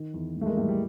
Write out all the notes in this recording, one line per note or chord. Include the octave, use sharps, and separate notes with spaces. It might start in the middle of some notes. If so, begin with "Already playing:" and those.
Already playing: D#3
E2
A2
A3
G#3 A#3
A2 G3 A3
G3